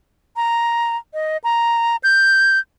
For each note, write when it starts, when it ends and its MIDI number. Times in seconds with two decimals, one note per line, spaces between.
0.36 0.97 82
1.14 1.37 75
1.44 1.96 82
2.04 2.59 91